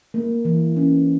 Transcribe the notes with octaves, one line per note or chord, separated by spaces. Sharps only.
A#3
E3
C#4